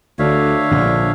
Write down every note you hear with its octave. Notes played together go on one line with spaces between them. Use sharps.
D2 D4 C#5 E5 F5
A#1 A#2 D3